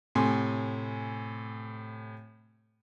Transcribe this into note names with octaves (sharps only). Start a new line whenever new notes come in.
A2 C3 G#5 C6